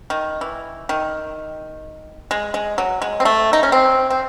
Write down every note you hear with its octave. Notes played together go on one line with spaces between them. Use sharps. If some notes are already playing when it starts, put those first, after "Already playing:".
D#3
E3
D#3
G#3
G#3
F#3
G#3
C4
A3
D#4
C#4
C4
C4